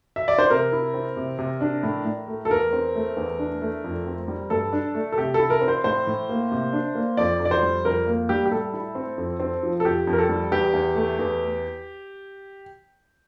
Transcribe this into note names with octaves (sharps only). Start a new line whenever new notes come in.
E5
D5
C5
C3 A#4
E4
C4
C3
C3
D4
A2
A2
A3
A4
E2 A#4
C4
A3
E2
D4
A3
F2
C4
G3
G2 A4
D4
A3
A4
C3 G4
E4 A4
A#4
C4
C5
A2 C5
A2
A#3
C3
D4
A#3
F2 D5
F2
D5
C5
G3
F2 A#4
A#3
G3 G4
G4
A2 A4
E4
C4
F2
C4
F3
A4
F2 G4
F2
A#4
A4
G3
E2 G4
E2
A3
E2